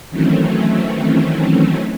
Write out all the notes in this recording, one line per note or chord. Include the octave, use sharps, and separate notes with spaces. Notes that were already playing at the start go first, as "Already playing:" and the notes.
D#3 E3 F#3 A3 C4 C#4